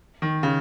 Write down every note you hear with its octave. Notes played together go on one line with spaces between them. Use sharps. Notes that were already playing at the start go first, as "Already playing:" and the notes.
D#3
C#3